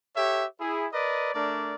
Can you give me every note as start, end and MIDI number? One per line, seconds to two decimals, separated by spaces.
0.15 0.44 67
0.15 0.44 69
0.15 0.44 73
0.15 0.44 76
0.59 0.86 64
0.59 0.86 68
0.92 1.30 70
0.92 1.30 71
0.92 1.30 74
0.92 1.30 75
1.33 1.75 57
1.33 1.75 62
1.33 1.75 70
1.33 1.75 74